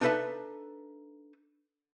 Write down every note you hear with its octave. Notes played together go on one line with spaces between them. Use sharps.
D4 D#4 A4 B4 E5 A5